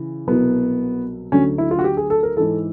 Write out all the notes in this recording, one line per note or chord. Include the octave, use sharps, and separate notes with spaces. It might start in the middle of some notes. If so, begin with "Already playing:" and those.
Already playing: C#3 E3
C2 B2 F#3 B3
D2 D3 F#3 C#4
E4
F4
F#4
G4
G#4
A4
A#4
G#2 E3 A4